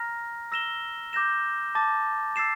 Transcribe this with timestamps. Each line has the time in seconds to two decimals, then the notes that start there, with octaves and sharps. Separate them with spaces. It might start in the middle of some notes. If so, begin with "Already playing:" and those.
Already playing: A#5 F6 A#6
0.52 E6 A#6 E7 G7
1.13 D6 G6 A#6 E7
1.75 A5 D6 A6
2.36 E6 A6 C7 E7